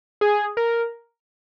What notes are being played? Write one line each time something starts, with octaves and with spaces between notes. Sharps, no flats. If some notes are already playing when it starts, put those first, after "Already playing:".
G#4
A#4